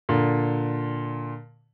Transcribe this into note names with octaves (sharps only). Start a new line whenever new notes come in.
A#2 D3